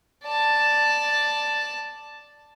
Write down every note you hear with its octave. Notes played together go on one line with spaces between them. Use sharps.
D5 A5